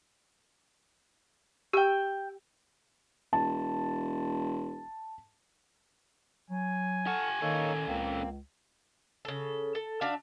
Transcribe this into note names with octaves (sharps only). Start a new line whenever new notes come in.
G4 G5 E6
E1 A5
F#3 G#5
G4 A4 F#5 C#6 F6
D#3 A#3 C#4 D#4 A4 C#5
C#2 A#3 C4
C#3 A4
A4
D4 F#4 E5 F5